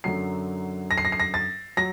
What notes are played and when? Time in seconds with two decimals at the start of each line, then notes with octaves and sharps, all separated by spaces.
0.04 F#2 D3 F#3 C7
0.91 A#6
0.98 C7
1.05 A#6
1.12 C7
1.20 A#6
1.34 A6
1.77 F#3 A#6